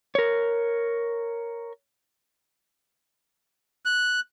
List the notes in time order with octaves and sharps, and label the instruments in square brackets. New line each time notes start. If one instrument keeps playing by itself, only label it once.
[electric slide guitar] A#4 C#5
[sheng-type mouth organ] F#6